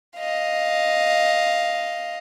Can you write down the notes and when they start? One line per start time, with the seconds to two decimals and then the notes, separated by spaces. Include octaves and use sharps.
0.18 D#5 F5